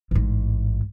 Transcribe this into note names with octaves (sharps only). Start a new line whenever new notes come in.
A1 G#2